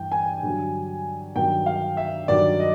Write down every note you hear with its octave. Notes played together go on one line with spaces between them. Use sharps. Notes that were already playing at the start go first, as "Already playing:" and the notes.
Already playing: G2 E3 G5
G#5
G2 D3 F#3
G2 D#3 F#3 G5
F5
E5
G2 D#3 F#3 D5
D#5